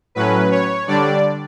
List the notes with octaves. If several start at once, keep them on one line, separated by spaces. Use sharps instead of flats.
A2 F#3 C#4 B4
C#5
D3 G3 D4 D5